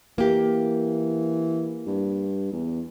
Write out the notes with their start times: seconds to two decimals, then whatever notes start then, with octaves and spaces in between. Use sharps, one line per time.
0.18 E3 A#3 G4
1.87 G2
2.52 E2